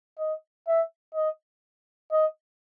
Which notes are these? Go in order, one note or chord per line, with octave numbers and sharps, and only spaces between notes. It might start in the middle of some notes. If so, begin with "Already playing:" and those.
D#5
E5
D#5
D#5